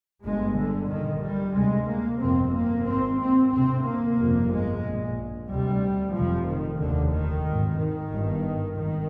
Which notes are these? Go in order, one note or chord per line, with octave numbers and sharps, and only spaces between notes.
G1 G2 G#3
D3
A#1 A#2 D#3
G3
D2 C3 G#3
A#3
G1 F2 C3 C4
A#3
G#1 G#2 C4
C4
D2 C3 C4
A#3
G1 F2 C3
G#3
A#1 A#2
D2 C3 G3
F1 F2 C3 F3
D#3
F1 D#2 D3
D#3
G#1 G#2
D#3
G1 G2
G#1 D#3